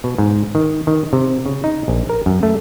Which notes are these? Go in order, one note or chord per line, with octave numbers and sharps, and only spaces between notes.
B2
G#2
D#3
D#3
C3
C#3
D#4
A#1
A#4
F#2
A3